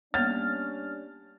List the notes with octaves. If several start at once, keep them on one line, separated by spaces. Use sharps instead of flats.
G3 A#3 B3 C#4 D4 C#5 F6 A6